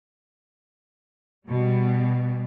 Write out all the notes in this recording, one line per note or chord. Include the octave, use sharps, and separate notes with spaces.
B2 G3